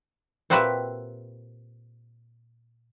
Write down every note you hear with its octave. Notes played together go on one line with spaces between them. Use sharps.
A#2 C4 F#4 G4 B4 E5